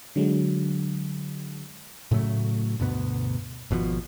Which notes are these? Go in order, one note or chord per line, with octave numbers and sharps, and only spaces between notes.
D3 F#3 G#3
A2 C#3 F#3 A3
D2 G2 B2 B3
G#1 B2 D#3 F3